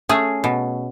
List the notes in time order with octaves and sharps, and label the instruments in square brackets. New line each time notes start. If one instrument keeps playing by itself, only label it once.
[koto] A3 C#4 G#4
B2